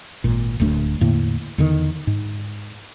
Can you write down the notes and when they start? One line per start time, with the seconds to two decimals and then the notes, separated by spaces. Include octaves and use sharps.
0.24 G#1 A#2
0.60 D1 D2 A3 D4
1.01 E2 A2 D3 A#3
1.58 E2 D3 D#3
2.07 G#2